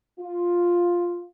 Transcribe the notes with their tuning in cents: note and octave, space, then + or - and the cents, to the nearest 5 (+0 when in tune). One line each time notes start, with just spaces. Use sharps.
F4 +5